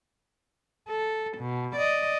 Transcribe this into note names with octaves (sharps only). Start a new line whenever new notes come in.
A4
B2
D5 D#5